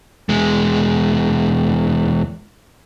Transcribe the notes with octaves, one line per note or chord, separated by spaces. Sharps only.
E2 G#3